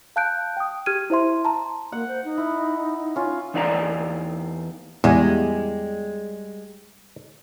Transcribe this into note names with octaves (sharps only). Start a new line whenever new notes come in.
F5 A5 F#6 G6 D7
G5 D#6
G4 F6 G#6 D#7
E4 C5 E5 C6
A5 A#5 C6
A#3 F#5
C5
D#4
E4
C#4 F4
E2 D#4 D5 F5 A#5
E2 G3 G#3